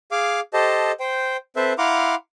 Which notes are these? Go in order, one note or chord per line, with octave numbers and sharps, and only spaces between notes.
G#4 F5 D6
G4 A4 C5 D#5 A5
C5 G5
C4 A4 B4 C5 E5
E4 F5 F#5 A#5 C6 D6